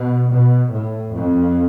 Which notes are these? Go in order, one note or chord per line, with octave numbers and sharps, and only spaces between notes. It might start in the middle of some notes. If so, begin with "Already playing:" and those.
Already playing: B2
B2
A2
F2